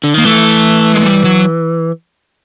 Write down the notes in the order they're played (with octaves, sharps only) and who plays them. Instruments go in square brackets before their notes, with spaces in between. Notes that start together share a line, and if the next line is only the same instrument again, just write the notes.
[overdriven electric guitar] D3
[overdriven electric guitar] D#3 [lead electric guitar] A#3
[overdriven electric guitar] E3 [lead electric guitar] A3
[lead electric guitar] G#3
G3
F#3